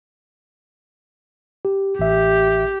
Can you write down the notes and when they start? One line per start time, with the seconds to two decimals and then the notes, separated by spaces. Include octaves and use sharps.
1.65 G4
1.99 A1 G4 E5